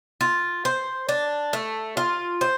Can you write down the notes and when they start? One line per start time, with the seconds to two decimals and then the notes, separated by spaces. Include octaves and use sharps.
0.21 F4
0.65 C5
1.09 D4
1.53 A3
1.97 F4
2.41 C5